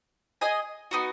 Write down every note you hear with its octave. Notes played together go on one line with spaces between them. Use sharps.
G#4 D#5 G#5
B3 D#4 F#4